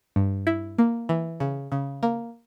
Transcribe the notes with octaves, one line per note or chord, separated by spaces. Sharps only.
G2
E4
A#3
E3
C#3
C#3
A#3